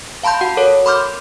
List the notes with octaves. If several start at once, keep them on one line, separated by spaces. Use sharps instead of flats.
F5 A5 B5 C6 G6
F#4 F#5
A4 A#4 C#5
B5 C6 D6 F6 G6